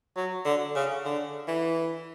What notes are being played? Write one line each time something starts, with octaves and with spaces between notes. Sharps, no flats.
F#3
D3
C#3
D3
E3